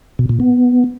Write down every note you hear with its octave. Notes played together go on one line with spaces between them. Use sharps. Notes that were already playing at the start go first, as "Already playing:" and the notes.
B2
A#2
B3